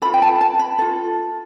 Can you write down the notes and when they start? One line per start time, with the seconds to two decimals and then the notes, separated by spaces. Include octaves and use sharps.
0.02 A4 B5
0.05 F4
0.14 G5
0.22 A5
0.41 A5
0.59 B5
0.79 F4 A4